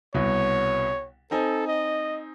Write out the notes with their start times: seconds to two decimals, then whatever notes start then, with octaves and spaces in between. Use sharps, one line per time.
0.14 C2 B2 C#5
1.31 C4 D#4 A4 G#5
1.67 D#5